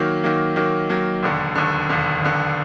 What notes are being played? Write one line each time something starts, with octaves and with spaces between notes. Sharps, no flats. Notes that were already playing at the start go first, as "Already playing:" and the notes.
Already playing: D#3 F#3 A#3
D#3 F#3 A#3
D#3 F#3 A#3
D#3 F#3 A#3
E1 D#2 D3
E1 D#2 D3
E1 D#2 D3
E1 D#2 D3